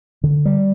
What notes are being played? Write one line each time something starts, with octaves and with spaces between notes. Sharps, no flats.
D3
G3